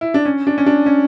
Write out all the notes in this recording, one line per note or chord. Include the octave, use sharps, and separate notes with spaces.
E4
D4
C#4
D4
C#4
D4
C#4